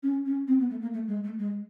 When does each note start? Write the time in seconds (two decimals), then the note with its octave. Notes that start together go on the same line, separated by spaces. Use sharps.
0.03 C#4
0.25 C#4
0.47 C4
0.59 B3
0.70 A3
0.81 A#3
0.93 A3
1.08 G#3
1.24 A3
1.38 G#3